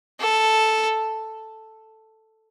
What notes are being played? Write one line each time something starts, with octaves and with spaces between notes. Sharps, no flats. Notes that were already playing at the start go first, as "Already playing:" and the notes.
A4